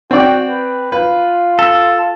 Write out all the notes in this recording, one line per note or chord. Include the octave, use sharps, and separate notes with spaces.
C4 F#4 D5 G5
B4
F4 B4
A4